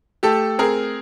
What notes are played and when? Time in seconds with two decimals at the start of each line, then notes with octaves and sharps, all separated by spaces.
0.23 A3 G4 A4
0.59 C4 G#4 A#4